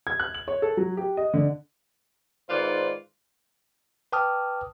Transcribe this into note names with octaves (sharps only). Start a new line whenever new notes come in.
G#6
F#6
F#7
C#5
A4
F#3
G4
D#5
D3
G#2 D#3 F4 B4 C5 D5
B4 G5 A5 D6 D#6 F6